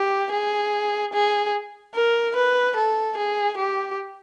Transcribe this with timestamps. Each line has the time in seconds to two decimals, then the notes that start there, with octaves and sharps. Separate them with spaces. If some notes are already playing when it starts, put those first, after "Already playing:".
Already playing: G4
0.32 G#4
1.13 G#4
1.95 A#4
2.36 B4
2.76 A4
3.17 G#4
3.58 G4